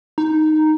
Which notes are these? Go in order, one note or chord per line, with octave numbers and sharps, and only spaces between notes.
D#4